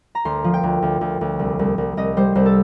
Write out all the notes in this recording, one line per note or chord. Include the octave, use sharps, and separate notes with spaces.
A#5
D2 C6
F3
G5
D2
D2
D2
D2
C2
C2
C2
C2 D#5
G3 C5
C2 C5
A4